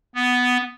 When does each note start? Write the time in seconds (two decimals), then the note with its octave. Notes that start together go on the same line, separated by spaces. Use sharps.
0.15 B3